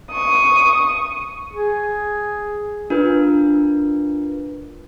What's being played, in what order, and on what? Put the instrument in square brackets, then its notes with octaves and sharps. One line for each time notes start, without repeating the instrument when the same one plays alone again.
[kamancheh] C#6 D#6
[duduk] G#4
[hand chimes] D4 F4 A#4 B4